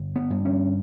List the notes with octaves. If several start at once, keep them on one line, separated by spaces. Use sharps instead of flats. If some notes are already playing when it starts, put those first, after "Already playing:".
Already playing: G1
B3
G2
C#4